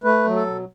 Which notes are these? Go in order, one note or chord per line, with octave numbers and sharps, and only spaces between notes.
A3 B4
F#3
A4
B2